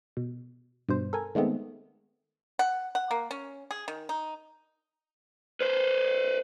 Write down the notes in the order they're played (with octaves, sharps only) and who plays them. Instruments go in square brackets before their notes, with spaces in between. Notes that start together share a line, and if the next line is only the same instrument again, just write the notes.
[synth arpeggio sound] B2
G2 B2 C5
A4 A#4 G#5
D#3 G#3 A3 B3 C4
[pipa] F#5
F#5
A#3
C#4
G#4
D#3
D#4
[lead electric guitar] B4 C5